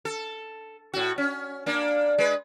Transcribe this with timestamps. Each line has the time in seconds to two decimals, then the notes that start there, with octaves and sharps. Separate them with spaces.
0.05 A4
0.93 A2 F#4
1.18 C#4
1.66 A#3 D4
2.18 G#3 B4